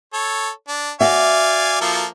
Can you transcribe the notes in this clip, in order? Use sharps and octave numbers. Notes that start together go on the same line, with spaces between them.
A4 C#5
D4
F#4 D5 E5 F5 G#5
F3 A#3 A4